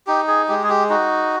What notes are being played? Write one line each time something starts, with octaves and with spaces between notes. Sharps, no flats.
D#4 G4
G#4
G#3 G4
G#4
G4
D#4 F#4